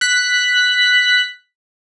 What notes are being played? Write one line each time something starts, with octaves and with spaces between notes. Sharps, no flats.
F#6 B6